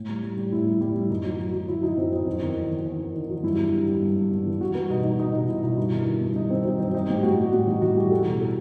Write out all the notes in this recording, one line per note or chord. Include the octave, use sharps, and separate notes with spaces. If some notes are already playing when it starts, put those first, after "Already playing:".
Already playing: A2
G3
G3
G3
A2 E4
G3
G3 E4
G3
F#2 D#4
F#3
F#3
F#3
F#3 E4
F#3 D#4
F#2 C4
F#3 D#4
E2 C4
D#4
D#3
E2
E2
E2
D#3
D#3
F#3
G2 E4
G2
G3
G3
G2
G2
G2
E3
G3 F#4
G3 B4
B2 D#4
G3 D#4
G3 D#4
B2 D#4
B2 E4
B2 D#4
G2 E4
D#3
D#3
G2
G2 D#4
D#3 C4
F#3 D#4
G2 C4
G3 D#4
A2 G4
A2 F#4
G3
A2 F#4
E3 D#4
E3 F#4
G3 G4
E2 A4
B2
A4